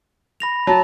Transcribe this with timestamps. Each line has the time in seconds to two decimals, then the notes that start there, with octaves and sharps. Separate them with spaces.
0.40 B5 A#6 F7
0.67 F#3 A5